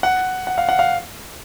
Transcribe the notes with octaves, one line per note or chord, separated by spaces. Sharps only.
F#5
F#5
F5
F#5
F5